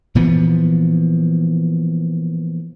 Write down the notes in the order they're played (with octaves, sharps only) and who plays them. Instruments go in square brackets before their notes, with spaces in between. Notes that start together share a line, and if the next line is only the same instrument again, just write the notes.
[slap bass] A#2 E3 F3 B3